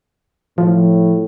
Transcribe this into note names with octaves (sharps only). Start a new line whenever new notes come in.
A2 F3